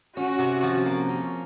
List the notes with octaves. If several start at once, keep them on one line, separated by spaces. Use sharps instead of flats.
C#4 F#4
C3
F3
A#3
C#4